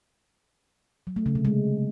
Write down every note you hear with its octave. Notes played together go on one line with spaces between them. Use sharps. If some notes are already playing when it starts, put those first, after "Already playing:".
F#3
A3
C#3
C3
G#3